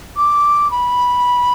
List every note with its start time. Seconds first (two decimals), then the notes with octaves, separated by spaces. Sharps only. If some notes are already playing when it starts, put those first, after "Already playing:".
0.17 D6
0.71 B5